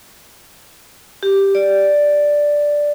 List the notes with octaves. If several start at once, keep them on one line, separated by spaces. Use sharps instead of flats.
G4
D5